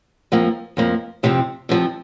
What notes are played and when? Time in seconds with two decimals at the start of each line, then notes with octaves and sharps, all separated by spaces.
0.32 F2 F3 A#3
0.77 F2 F3 A#3
1.23 F2 C3 F3 C4
1.69 F2 C3 F3 C4